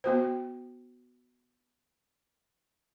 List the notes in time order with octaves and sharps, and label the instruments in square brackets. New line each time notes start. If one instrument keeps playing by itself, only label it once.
[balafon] B3 F#4 C5